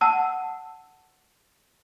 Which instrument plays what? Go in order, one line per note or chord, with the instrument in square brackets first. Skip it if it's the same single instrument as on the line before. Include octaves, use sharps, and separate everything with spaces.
[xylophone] F#5 A5 E6